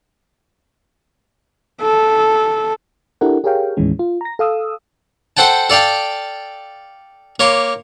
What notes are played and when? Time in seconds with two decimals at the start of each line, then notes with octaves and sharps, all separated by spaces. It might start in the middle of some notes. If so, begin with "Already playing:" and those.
1.81 A4
3.21 D4 E4 G4 A4 A#4 F#5
3.44 G4 G#4 A#4 C#5 F5 G5
3.77 D#2 A2 D#3 E3 G#3 C#4
3.99 F4
4.21 A#5 A#6
4.39 A4 F5 D#6 E6
5.37 A4 C5 F#5 G5 A5
5.70 A4 D5 F5 G5 A5
7.40 A#3 C#5 C6 D6